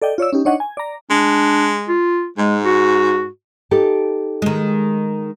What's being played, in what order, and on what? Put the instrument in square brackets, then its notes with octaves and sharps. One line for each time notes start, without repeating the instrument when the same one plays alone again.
[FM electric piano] A4 D5 D#5 G5
F4 C#5 D5 E6
C#4 D#4 G4
D4 D#4 C#5 D#5 F#5 C#6
G#5
D5 A#5
[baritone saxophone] G#3 [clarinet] D4
[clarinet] F4
[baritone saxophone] G#2 [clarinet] G#3
[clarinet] F#4
[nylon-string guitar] D#4 G4 A4
[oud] D#3 G#3